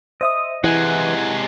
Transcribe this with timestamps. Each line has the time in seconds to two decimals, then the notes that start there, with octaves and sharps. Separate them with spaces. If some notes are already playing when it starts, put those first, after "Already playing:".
0.21 C5 D#5 E5 D#6
0.64 C3 E3 G#3 E4 F#5 G#5